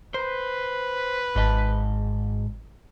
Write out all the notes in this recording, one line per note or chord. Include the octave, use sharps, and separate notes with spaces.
B4 C5
G#1 G#2 D#5 A5